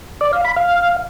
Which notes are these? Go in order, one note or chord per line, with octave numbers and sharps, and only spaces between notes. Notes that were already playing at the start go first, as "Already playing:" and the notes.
D5
F5
B5
F5